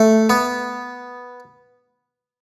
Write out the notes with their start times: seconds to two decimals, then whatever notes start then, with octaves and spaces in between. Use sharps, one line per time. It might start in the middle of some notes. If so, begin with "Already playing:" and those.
Already playing: A3
0.30 B3